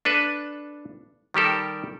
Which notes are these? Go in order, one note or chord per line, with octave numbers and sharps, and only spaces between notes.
D4 A4 B4
D#3 G3 G4 A4 A#4